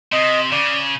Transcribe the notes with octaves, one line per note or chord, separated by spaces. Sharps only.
C3 D#5
C#3 D5